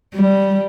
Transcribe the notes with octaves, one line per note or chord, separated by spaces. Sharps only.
G3